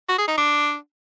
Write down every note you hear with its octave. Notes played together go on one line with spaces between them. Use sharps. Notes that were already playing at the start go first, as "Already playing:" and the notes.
F#4
G#4
D#4
D4